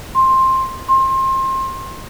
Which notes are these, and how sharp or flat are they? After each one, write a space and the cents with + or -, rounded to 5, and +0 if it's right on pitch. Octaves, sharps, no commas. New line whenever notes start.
C6 +15
C6 +30